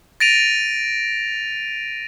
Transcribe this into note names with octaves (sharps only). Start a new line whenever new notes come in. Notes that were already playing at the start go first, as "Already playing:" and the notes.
A6 A#6 D7 D#7 F7